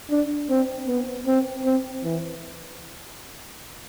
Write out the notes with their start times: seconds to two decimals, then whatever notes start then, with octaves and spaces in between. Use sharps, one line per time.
0.11 D4
0.50 C4
0.88 B3
1.27 C4
1.65 C4
2.04 E3